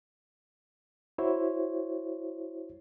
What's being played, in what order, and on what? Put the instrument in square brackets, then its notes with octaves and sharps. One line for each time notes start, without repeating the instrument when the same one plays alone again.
[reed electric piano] E4 F#4 C5 C#5